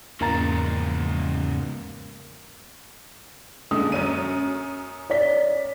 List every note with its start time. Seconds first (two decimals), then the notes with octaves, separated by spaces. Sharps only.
0.21 E2 G#2 C#3 A#3 A#5 A6
3.71 A#2 D3 G#3 D#6
3.92 F#2 C#4 D#7
5.10 C#5 D5 B6